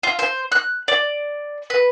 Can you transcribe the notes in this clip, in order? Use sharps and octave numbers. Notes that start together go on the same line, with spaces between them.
F4
C5
F#6
D5
B4